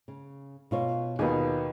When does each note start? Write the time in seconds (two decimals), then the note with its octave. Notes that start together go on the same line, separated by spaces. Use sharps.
0.08 C#3
0.71 B2 F4 C#5
1.19 D#2 B2 F4 G#4